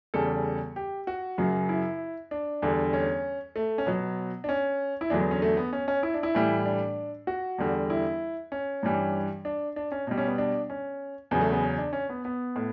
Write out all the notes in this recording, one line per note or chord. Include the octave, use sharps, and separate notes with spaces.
E2 C#3 G3 A4
G4
F#4
F#2 C#3 F#3
E4
D4
E2 D3 G3
C#4
A3
C#4
B2 F#3 B3
D4
C#4
E4
E2 D3 F#3 D4
B3
C#4
A3
B3
C#4
C#4
E4
D4
E4
A2 E3 G3
D4
F#4
E2 D3 G3
E4
C#4
G2 E3 G3
D4
D4
C#4
B2 G3
C#4
B3
D4
C#4
E2 C#3 F#3 B3
A3
B3
C#4
D4
C#4
B3
B3
A2